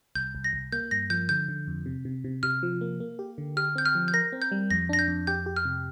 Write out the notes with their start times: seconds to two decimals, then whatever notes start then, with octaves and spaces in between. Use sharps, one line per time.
0.15 C2 G6
0.35 C2
0.44 A#6
0.53 C2
0.72 A#3 G6
0.91 G2 A#6
1.10 F3 G6
1.29 D3 G6
1.48 D3
1.67 F2
1.86 C3
2.05 C3
2.24 C3
2.43 C3 F6
2.63 F3
2.81 A#3
3.00 A#3
3.19 G4
3.38 D3
3.57 G4 F6
3.76 C4 G6
3.85 F6
3.95 F3
4.08 G6
4.14 A#4 A#6
4.32 C4
4.42 G6
4.52 G3
4.70 F2 A#6
4.89 D4 A#6
4.99 G6
5.08 F2
5.27 G4 G6
5.46 G4
5.56 F6
5.65 C3